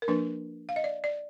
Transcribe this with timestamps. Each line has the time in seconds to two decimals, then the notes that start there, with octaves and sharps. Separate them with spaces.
0.02 A#4
0.08 F3 A#3 D4 B4
0.69 F5
0.76 D#5
0.84 D5
1.04 D5